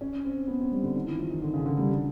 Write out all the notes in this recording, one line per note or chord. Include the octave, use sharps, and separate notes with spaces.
C#4
C4
B3
C4
G3
D3
D#3
E3
F3
D#3
D3
C#3
D3
G3